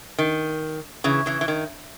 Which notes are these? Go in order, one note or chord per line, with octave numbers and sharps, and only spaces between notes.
D#3
C#3 E3
C#3 E3
E3
D#3